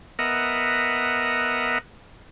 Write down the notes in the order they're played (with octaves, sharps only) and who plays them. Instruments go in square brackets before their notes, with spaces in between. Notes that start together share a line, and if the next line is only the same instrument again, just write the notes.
[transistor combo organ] B3 A#4 D#5 E5 F#5 A#5